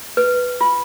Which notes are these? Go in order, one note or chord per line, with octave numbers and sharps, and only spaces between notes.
B4
F4